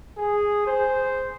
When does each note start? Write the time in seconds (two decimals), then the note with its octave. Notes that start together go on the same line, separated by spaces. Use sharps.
0.18 G#4
0.67 C5